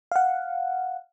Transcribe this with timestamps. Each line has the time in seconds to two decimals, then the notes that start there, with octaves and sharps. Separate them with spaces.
0.12 F5 F#5